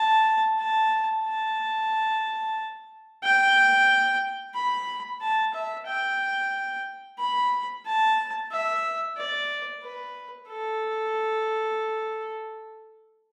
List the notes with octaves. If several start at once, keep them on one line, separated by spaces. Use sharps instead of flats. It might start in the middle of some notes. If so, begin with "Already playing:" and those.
Already playing: A5
A5
A5
G5
B5
A5
E5
G5
B5
A5
E5
D5
B4
A4